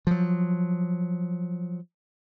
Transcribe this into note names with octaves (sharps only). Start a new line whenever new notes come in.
F3 F#3